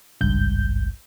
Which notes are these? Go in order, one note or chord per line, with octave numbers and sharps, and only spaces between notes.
G#1 C#2 G2 G6